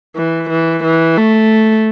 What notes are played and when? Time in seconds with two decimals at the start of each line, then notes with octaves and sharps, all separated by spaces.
0.16 E3
0.49 E3
0.83 E3
1.17 A3